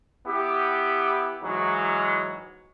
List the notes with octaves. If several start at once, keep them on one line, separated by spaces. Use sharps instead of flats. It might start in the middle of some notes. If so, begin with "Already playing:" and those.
B3 E4 G4
G#2 E3 F#3 G#3